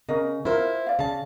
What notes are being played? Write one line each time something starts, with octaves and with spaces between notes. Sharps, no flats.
C#3 C#4 A#4 D#5
E4 F4 A#4 C5
D5 F5
C#3 A5